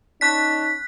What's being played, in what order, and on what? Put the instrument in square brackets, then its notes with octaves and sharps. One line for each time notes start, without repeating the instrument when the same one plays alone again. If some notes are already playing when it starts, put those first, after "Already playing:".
[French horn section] C#4 D#4 [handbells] D5 A5 C#6 [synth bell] F#6 B6